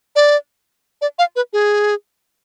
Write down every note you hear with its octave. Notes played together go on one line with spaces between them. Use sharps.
D5
D5
F5
B4
G#4